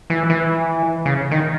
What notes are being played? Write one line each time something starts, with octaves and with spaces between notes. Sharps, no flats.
E3
E3
C#3
D#3